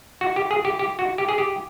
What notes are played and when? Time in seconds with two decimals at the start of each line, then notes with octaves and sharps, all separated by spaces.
0.21 F#4
0.36 G4
0.51 G#4
0.65 G4
0.79 G4
0.99 F#4
1.18 G4
1.29 G#4
1.38 G4